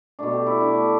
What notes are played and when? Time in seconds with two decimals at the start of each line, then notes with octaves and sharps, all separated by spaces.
0.19 B2 A3 D4
0.33 G4
0.47 E4
0.61 D4
0.74 A3